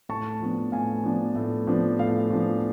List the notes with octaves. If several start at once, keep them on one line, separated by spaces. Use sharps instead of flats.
A2 A5 C#6
F3 B3 D4
A2 F5 G#5
F3 B3 D4
A2
F3 B3 D4
A2 F5
F3 B3 D4